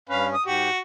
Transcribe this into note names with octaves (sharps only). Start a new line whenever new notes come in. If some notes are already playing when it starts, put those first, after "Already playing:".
G2 C#4 B4 F5
D#6
G#2 F#4 G4